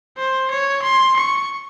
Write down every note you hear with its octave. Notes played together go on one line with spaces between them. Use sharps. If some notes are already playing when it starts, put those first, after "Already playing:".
C5
C#5
C6
C#6